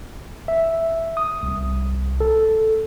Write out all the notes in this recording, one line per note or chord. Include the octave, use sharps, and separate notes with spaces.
E5
D#6
C2
A4